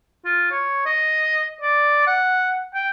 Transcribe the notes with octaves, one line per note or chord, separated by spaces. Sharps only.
F4
C#5
D#5
D5
F#5
G5